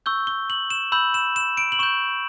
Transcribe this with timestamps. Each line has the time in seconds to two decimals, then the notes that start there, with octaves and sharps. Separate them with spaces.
0.06 C#6 E6 G6 G7
0.27 G7
0.50 F#7
0.70 E7
0.92 B5 E6 G6 F#7
1.14 E7
1.36 E7
1.57 D7
1.72 F#7
1.79 C#6 G6 E7